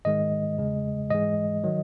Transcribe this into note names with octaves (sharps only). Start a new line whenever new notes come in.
G#2 D#3 G#3 D#5
E2 C#3 G#3
G#2 E3 G#3 D#5
D#3 F#3